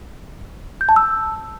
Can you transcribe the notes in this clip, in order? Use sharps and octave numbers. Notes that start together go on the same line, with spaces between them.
G6
A5
E6